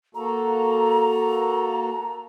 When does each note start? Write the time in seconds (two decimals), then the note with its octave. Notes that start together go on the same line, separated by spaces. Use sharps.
0.15 A#3 F#4 A4 A#5